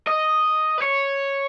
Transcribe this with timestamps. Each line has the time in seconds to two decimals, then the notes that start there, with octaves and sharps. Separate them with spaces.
0.07 D#5
0.78 B4
0.82 C#5